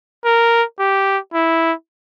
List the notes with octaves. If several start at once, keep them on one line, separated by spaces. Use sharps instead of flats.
A#4
G4
E4